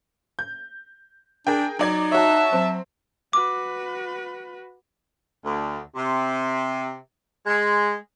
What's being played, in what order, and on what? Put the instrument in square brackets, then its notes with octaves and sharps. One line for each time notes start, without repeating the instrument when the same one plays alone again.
[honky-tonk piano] G6
[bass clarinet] D4 [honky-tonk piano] G#4 A#4 G5
[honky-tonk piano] F#3 D5 G#6 [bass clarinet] D#4
[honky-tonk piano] F#4 C#5 [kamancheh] E5 A5
[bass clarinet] F#3 [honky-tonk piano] C4
[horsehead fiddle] F#4 B4 [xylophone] D6
[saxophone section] D2
C3
G#3